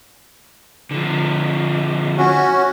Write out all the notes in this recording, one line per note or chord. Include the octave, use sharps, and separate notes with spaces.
D3 F3
C#4 F#4